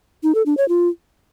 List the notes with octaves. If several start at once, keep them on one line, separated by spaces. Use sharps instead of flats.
D#4
A4
D4
C#5
F4